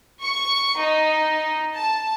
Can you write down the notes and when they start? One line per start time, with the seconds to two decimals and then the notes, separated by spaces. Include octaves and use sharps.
0.20 C#6
0.78 D#4
1.74 A5